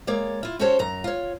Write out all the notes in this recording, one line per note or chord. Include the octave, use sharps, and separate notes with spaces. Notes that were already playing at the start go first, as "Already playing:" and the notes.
G#3 A#3 C#5 D5
E4 F4
C#4 F#4 G4 A4 C5 C#5
F#2 A#5
F4 C#5